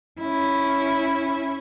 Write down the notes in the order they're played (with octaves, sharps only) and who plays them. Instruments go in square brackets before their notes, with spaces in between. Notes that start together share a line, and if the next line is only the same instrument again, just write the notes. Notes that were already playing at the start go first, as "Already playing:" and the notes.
[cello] C#4 E4